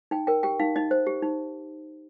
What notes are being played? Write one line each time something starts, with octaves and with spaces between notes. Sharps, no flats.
D#4 G5
A#4 G5
G4 G5
D#4 F5
D#4 D#5
C5
G4
D#4